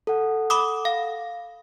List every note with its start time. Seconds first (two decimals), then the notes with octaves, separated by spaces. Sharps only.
0.07 A4 F#5
0.50 B5 D6 D#6
0.85 F5